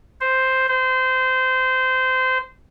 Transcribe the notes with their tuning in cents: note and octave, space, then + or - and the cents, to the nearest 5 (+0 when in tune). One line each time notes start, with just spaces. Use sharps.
C5 +0
C5 -20